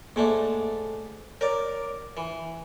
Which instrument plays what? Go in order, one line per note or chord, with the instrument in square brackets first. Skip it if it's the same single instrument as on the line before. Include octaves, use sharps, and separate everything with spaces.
[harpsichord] G#2 A3 D4 [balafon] A#3 E5
[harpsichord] A#4 D5 [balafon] C#5
[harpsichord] E3